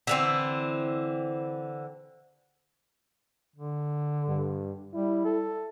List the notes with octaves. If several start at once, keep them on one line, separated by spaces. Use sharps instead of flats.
D3 E3 C4
D3
G2
G3 E4
A4